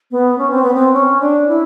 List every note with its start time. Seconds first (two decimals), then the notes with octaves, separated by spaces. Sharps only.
0.11 B3
0.38 C#4
0.51 C4
0.62 B3
0.75 C4
0.93 C#4
1.21 D4
1.48 E4